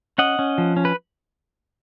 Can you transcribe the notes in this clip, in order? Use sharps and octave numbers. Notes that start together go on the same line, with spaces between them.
C#4 D#5 F#5
C#4
F3
C#4
B4